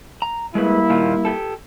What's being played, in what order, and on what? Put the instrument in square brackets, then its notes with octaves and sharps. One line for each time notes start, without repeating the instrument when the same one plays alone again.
[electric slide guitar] A#5
[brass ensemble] G3 A#3 E4 [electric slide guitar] G#3 G#4 B4
[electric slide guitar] A#2 D#3 F4
G4 A4